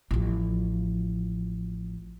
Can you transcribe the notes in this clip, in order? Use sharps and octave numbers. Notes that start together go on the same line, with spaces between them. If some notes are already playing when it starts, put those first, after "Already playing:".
A1 F3